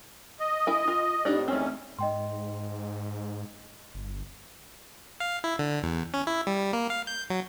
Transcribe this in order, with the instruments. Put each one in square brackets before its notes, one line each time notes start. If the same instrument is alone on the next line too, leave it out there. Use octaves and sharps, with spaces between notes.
[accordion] D#5
[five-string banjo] E4 G#5
F4
[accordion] F2 A2 [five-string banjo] D4 D#4 G4
[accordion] E2 D#3 C#4 [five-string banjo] A3 C4
[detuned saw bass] G#2 [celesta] D#5 G5 C6
[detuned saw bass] G1
[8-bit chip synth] F5
E4
D3
E2
C#4
E4
G3
A#3
F5
G6
F#3